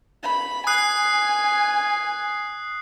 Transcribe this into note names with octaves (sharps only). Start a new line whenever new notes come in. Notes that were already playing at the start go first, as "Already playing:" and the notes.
B5
G#5 D#6 F#6 C7